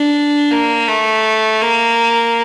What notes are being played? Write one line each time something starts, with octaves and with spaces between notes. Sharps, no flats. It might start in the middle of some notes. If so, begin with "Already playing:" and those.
Already playing: D4
A#3
A3
A#3